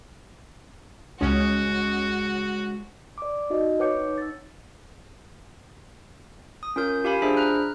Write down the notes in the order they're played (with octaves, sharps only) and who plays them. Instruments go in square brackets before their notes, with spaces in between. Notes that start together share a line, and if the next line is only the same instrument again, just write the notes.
[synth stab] C#2 C#4 [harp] G#3 [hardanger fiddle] F#4
[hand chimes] D5 D6
D#4 F#4 D#5
B4 C#5 F#5 D6 G6 C#7
D#4
E6 A6
[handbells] D#6
C#4 F4 A#4 G6
F4 G4 F5 G#5 B5
D4 G#4 C5 E5 B5 B6
A#5 F6 F#6